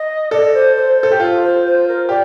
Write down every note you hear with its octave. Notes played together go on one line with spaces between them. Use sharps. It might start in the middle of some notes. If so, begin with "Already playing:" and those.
Already playing: D#5
A4 D5
C5
C5
A4 C5
G4
F4 A4
C5
C5
A#4
G4 D5